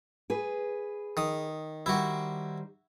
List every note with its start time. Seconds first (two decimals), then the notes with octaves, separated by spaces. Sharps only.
0.30 G#4 B4
1.17 D#3 D#6
1.86 D#3 G3 E4 F#4 C5